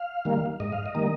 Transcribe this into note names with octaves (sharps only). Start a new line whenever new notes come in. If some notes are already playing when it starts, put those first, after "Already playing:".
Already playing: F5
D#3 G3 A#3
G#2 D#5
F5
D#5
D#3 G3 A#3